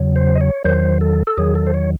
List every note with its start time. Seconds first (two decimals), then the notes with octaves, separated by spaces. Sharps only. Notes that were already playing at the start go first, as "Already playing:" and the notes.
Already playing: E2 C#3 F#3
0.16 C5
0.35 D#5
0.41 C#5
0.64 E2 D#3 F#3 C5
1.01 A4
1.27 A4
1.37 E2 D#3 F#3 G#4
1.55 A4
1.67 C5
1.74 C#5